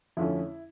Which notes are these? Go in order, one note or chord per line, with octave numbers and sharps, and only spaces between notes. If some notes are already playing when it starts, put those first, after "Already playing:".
F2 D3 F3 A3 C#4 E4